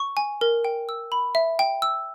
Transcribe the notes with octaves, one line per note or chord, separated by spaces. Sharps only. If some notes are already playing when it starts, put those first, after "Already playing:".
Already playing: C#6
G#5
A#4
G5
E6
B5
E5
G5
E6